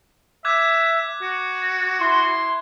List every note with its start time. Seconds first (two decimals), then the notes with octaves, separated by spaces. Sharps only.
0.45 E5 D6 F#6 G#6
1.22 F#4
2.01 E4 C6